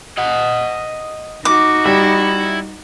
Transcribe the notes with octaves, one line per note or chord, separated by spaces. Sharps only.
D#5 F#5
D#4 F#4 D6
G3 E4